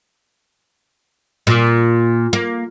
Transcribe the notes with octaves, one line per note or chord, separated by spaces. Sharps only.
A#2
A#3